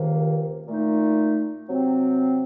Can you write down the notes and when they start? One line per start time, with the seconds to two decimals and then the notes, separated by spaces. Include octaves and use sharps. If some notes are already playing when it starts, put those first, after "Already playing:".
Already playing: C#2 C3 D#3 A#3
0.67 A#2 A3 D#4
1.68 C3 F#3 C4